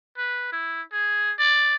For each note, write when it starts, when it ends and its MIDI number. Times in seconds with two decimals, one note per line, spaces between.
0.18 0.49 71
0.52 0.82 64
0.92 1.32 68
1.39 1.76 74